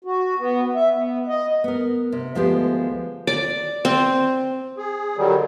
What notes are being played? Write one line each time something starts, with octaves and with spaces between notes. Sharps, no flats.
F#4
B3
E5
B3
D#5
B3 A#4
C3
D2 F3 G#3 B3 G4 C5
D5
C4
G#4
D3 D#3 F#3 G3